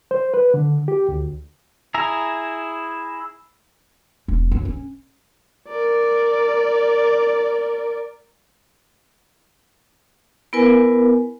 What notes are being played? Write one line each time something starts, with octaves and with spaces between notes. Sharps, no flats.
C5
B4
D3
G4
D2
E4 G#4 A#5
E1
F#2
C#4
A#4 D5
B3 E4 A#4 B4 G#5